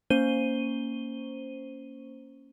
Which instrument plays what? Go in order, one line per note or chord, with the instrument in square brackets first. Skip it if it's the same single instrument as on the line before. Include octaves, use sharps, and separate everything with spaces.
[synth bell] A#3 C#4 C5 D#7 G7